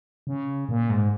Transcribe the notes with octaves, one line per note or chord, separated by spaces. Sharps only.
C#3
A#2
G#2